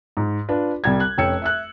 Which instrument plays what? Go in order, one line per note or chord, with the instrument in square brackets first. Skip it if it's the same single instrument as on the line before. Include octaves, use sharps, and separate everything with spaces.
[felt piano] G#2
D4 F4 B4
C2 G3 G#6
F#6
F1 C#4 G5 E6 G#6 C#7
E5 E6 F#6